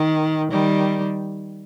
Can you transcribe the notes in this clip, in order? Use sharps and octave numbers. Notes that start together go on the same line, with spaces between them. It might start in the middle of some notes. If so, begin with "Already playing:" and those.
Already playing: D#3
D#3 G3